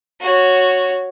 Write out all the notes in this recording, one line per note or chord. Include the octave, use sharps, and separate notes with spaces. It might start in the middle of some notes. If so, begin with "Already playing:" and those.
F#4 C#5